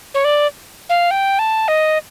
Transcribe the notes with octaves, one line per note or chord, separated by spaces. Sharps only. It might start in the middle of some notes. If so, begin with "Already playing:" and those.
C#5
D5
F5
G5
A5
D#5